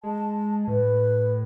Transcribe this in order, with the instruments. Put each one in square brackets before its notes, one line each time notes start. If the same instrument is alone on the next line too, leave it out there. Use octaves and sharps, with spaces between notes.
[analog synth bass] G#3 [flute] A5
[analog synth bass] A2 [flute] B4